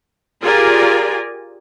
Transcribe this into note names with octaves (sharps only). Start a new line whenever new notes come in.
F4 G4 G#4 A#4 D5 G#5